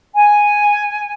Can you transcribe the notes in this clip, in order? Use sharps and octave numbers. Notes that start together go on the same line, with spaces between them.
G#5